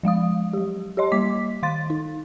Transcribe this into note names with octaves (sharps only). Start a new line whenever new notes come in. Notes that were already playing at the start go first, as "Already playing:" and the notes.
F3 G#3 F5 D#6
F#3 G4
G4 C#5 D#5 C6
G3 A#3 D6 B6
D#3 F5 C6 A6
D#4